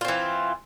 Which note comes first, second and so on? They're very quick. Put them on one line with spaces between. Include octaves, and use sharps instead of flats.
F4 C4 E3